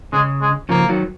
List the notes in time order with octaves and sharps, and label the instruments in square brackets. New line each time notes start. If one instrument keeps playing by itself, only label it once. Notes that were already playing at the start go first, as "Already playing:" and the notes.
[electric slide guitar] C#3 [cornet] G#3
[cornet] G#3
[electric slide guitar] C#3 F3 [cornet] A#3
[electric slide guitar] D#3 F#3